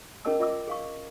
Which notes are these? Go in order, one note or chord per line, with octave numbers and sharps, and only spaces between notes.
C#4 G#4 A#4 D#5 A5 E6
F4 D#5 E5 D6 E6
G#4 F5 C#6